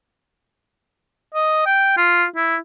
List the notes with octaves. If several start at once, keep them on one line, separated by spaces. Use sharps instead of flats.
D#5
G5
F4
E4